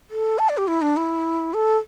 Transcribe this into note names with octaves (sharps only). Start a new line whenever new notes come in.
A4
A5
D5
G4
E4
D4
E4
A4